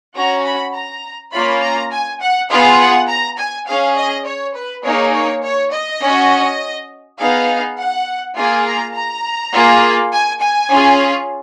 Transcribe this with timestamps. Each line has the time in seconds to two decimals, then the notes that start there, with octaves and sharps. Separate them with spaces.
0.16 C#4 F#4 A#5
0.45 B5
0.74 A#5
1.33 A#3 C#4 F4 B5
1.62 A#5
1.91 G#5
2.21 F#5
2.50 B3 F4 G#4 F5
2.80 F#5
3.08 A#5
3.38 G#5
3.67 C#4 G#4 F5
3.96 D#5
4.26 C#5
4.55 B4
4.84 A#3 D#4 G#4 C#5
5.14 C#5
5.43 C#5
5.72 D#5
6.01 C#4 F#4
7.18 B3 D#4 G#4 F5
7.77 F#5
8.36 A#3 F4 G#4 G#5
8.65 A#5
8.95 A#5
9.53 A#3 F4 G#4
10.12 G#5
10.41 G#5
10.70 C#4 F4 G#4